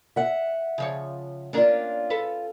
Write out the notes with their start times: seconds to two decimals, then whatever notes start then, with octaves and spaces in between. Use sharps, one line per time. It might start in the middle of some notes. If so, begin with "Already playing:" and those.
0.16 E5 F#5
0.78 C#3 F3 C#5
1.53 A#2 C#4 D4 F4 A#4
2.10 A4 B4